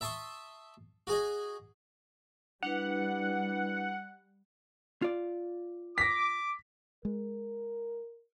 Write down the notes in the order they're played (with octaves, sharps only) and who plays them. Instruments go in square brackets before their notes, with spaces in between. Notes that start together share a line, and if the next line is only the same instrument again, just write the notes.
[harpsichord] E5 A5 C6 C#6 D#6
F#4 G#4 D#5
[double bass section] G3 [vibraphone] D4 E4 B4 [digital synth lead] F#5
[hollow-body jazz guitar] F4 D5
[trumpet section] D6 [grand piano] A#6 B6
[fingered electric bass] G#3 [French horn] A#4